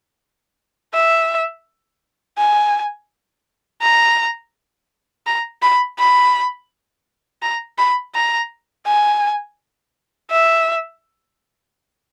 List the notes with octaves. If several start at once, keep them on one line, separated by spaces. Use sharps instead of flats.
E5
G#5
A#5
A#5
B5
B5
A#5
B5
A#5
G#5
E5